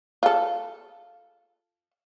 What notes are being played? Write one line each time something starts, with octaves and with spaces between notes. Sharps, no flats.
F4 A4